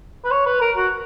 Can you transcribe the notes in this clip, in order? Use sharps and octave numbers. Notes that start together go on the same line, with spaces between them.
B4
C#5
B4
A#4
F#4